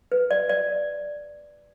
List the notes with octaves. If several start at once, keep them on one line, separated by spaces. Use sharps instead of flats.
B4
D5
D5